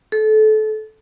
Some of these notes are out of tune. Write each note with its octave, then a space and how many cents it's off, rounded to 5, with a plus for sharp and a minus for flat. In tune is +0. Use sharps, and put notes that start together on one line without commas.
A4 -25